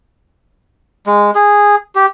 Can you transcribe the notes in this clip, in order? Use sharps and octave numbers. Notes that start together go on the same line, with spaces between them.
G#3
G#4
G4